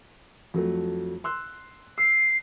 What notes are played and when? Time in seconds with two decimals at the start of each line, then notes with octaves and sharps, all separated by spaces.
0.54 F2 F#3 A3
1.24 C6 E6 F#6
1.98 E6 C7